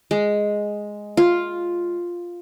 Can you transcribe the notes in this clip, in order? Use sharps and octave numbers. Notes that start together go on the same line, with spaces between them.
G#3
F4